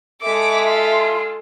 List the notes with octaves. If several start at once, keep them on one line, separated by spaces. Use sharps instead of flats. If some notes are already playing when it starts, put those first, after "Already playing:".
G#3 A4 E5 D6
F4